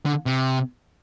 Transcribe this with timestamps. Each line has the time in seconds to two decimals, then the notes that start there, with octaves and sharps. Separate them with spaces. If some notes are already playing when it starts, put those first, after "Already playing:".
0.06 D3
0.26 C3